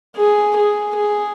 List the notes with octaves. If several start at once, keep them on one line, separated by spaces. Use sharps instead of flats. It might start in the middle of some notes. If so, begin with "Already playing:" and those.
G#4
G#4
G#4